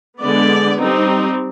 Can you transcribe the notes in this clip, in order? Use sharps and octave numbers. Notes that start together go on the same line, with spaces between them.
D3 G#3 B3 D5
G3 C4 D#4